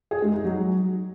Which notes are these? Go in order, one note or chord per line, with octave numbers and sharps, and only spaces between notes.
G#4
G#3
D#4
F#3